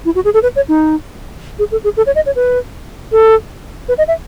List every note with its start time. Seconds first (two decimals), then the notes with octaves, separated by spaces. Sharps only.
0.05 E4
0.15 F#4
0.25 G#4
0.34 A4
0.43 B4
0.56 C#5
0.68 D#4
1.59 G#4
1.72 A4
1.84 G#4
1.97 A4
2.06 C#5
2.15 D#5
2.26 C#5
2.36 B4
3.12 A4
3.89 B4
3.98 D#5
4.08 E5